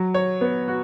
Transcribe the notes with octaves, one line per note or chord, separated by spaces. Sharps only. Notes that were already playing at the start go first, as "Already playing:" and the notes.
Already playing: F#3
C#5
B3
F#4